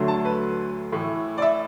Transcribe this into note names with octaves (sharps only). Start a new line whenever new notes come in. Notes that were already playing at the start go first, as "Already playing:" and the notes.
Already playing: D2 D3 F#3 A3
A5
B4
A2 E3 A3
D5
E5